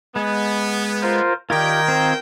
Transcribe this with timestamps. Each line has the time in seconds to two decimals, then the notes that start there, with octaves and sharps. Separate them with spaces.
0.16 G#3 B3
1.02 F4 A#4 C5
1.50 D#3 F4 G4 A#4 D5 G5 G#6
1.88 C4 F4 C5